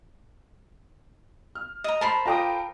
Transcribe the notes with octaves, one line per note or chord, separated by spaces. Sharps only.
F6
D#5 A#5
A#4 C5 A5 B5
F4 A4 G5 A#5 D6 D#6